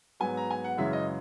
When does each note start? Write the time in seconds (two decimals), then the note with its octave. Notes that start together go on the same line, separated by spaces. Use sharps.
0.20 G#2 F#3 B3 G#5
0.37 A#5
0.51 G#5
0.64 F#5
0.77 F#2 C#3 E3 G#3 E5
0.93 D#5